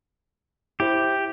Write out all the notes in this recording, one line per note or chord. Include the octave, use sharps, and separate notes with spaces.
E4 G4 C5